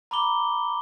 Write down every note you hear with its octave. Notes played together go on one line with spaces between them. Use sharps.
A#5 B5 D6 G7